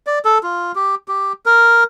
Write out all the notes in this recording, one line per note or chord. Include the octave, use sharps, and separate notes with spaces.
D5
A4
F4
G4
G4
A#4